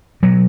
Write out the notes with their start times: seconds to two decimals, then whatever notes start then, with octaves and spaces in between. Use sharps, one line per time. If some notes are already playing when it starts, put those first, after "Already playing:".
0.23 B2 F#3